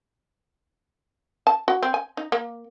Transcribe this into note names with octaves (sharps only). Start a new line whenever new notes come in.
A5
F#4
C4
G#5
D#4
A#3